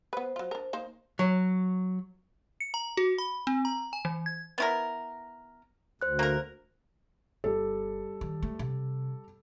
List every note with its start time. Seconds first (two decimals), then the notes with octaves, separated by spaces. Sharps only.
0.13 B3 B4 C5
0.36 F#3 F4
0.51 D4 A#4
0.73 A#3 D#4 C5
1.19 F#3
2.60 C#7
2.74 A#5
2.97 F#4
3.18 B5
3.47 C4
3.65 A#5
3.93 G#5
4.05 E3
4.26 G#6
4.58 B3 E4 A#4
6.02 D2 C5 F#6
6.19 A#3 A#4
7.44 G1 G3 A4
8.21 D#3
8.43 A3
8.59 C3